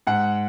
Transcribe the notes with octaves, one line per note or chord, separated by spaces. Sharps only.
G#2 F#5